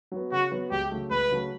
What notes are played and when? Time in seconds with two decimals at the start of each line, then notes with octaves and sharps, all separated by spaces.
0.12 F#3 B3
0.32 C#3 F#4
0.52 F#3 B3
0.71 C#2 G4
0.90 C#3 F#3 A3
1.10 C#2 B4
1.30 C#3 F#3 A3